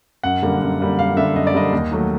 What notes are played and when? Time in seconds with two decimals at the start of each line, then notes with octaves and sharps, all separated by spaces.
0.23 F#2 F#5
0.43 D3 G3 A#3
0.61 F#2
0.80 D3 G3 A#3
0.98 F#2 F5
1.17 D3 G3 A#3 E5
1.36 F#2 D#5
1.47 D5
1.54 D3 G3 A#3 D#5
1.72 D#2
1.92 D#3 F#3 A3